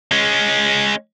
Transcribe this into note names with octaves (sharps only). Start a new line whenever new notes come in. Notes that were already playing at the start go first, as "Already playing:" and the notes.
G#3 C#4